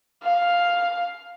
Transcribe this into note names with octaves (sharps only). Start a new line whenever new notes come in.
F5